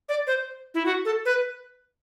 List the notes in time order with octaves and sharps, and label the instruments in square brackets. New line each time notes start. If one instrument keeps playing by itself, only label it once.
[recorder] D5
C5
E4
F#4
A4
B4